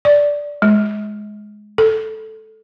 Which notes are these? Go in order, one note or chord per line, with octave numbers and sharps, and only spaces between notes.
D5
G#3
A4